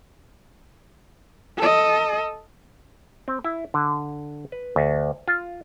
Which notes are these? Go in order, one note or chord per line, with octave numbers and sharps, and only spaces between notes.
A4 D#5
C4
E4
D3
B4
D2
F4